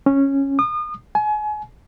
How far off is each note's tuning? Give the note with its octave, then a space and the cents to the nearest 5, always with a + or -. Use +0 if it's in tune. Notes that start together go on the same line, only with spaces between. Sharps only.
C#4 -10
D#6 -35
G#5 +35